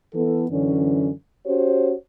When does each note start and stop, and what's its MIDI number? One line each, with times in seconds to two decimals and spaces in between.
0.13 0.45 52
0.13 0.45 59
0.13 0.45 64
0.13 0.45 69
0.50 1.10 42
0.50 1.10 50
0.50 1.10 52
0.50 1.10 61
1.45 1.92 61
1.45 1.92 66
1.45 1.92 67
1.45 1.92 72
1.45 1.92 73